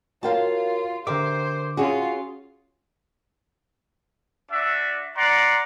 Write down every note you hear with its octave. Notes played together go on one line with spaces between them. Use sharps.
F4 F#4 A#4 C#5 F5 G5 A5
D3 G4 A#4 C5 E5 D6
C#4 F4 F#4 G#4 C#5
D4 F#4 E5
D5 F#5 A#5 C6